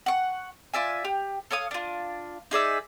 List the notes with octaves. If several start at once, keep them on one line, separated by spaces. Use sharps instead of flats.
F#5 C#6
F4 D5 E5 G#5
G4
A4 C#5 F5 D#6
D4 F4
D#4 G#4 D5 E5